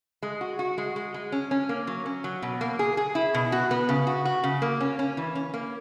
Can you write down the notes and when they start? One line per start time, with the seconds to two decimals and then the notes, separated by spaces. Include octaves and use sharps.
0.23 G#3
0.41 F#4
0.59 F#4
0.78 G#3
0.96 G#3
1.14 G#3
1.32 C#4
1.51 C#4
1.69 A#3
1.87 F#3
2.06 C#4
2.24 F#3
2.42 B2
2.61 A#3
2.79 G#4
2.97 G#4
3.15 E4
3.34 B2
3.52 F#4
3.71 B3
3.89 C#3
4.07 F#4
4.25 F#4
4.43 C#3
4.62 A#3
4.81 C#4
4.99 C#4
5.17 E3
5.35 C#4
5.54 A#3